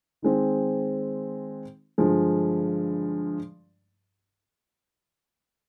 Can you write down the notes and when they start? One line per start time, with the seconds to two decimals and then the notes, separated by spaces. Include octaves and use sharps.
0.22 D#3 G#3 C4
1.98 G2 D3 F3 G#3